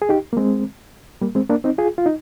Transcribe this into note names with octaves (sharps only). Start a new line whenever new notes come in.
G#4
D#4 G4
A#3
G#3 C4
G3 A#3
G#3 C4
A#3 D4
C4 D#4
F4 G#4
F4
D#4